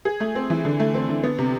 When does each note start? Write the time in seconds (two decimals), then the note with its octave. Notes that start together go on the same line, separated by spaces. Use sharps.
0.05 G#4
0.20 A3
0.35 C4
0.50 E3
0.65 D3
0.80 A3
0.94 C4
1.09 D3
1.23 B3
1.38 C3